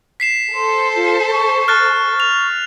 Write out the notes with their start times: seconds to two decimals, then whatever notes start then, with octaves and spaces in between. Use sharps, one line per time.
0.20 B6 C7 E7
0.54 A4 C5 C6
0.96 F4
1.31 C#6
1.68 F6 F#6 A6
2.20 F7